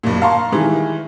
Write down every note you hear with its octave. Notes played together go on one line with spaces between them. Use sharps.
F#1 G2 A#2
F5 A5 A#5 C6 C#6
D#3 E3 G3 G#3